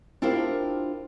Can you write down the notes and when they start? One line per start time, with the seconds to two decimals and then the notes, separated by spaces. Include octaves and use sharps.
0.22 D4 E4 F4 G4 A#4 C5